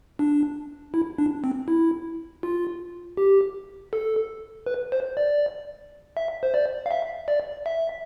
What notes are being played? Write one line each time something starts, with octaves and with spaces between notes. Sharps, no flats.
D4
E4
D4
C4
E4
F4
G4
A4
B4
C5
D5
E5
C5
D5
F5
E5
D5
E5